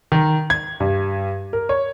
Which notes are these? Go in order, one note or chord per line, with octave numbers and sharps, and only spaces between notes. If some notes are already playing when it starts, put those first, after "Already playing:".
D#3
G#6
G2
A#4
C#5